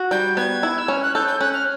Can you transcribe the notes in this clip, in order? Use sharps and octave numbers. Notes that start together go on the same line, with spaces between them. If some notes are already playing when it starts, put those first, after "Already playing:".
Already playing: F#4
G3 G6
B3 G#6
E4
E6
C#4 F6
F#6
A4 G6
G6
C#4 F#6
F6